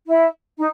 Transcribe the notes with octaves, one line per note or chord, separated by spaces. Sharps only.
E4
D#4